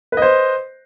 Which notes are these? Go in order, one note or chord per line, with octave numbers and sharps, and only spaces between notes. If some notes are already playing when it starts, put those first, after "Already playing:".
B4 C5 D#5